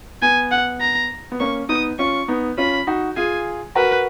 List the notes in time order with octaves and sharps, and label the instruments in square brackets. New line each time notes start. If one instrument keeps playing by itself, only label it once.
[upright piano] B3 [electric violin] G#5
[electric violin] F#5
A#5
[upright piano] B3
[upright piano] A#3 C#4 [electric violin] C#6
[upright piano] B3 D#4 [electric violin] D#6
[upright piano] C#4 F4 [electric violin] C#6
[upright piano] B3 D#4
[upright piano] C#4 F4 [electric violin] B5
[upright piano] D#4 F#4
[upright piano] F4 G#4 [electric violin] G#5
[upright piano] F#4 A#4 [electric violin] B4